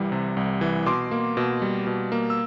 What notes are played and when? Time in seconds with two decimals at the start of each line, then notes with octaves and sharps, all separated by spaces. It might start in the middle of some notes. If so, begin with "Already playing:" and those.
Already playing: C2 E3 G3
0.12 C3
0.37 C2
0.61 E3
0.86 B2 C6 D6
1.11 A#3
1.37 B2
1.62 G3
1.87 B2
2.12 A#3
2.30 E6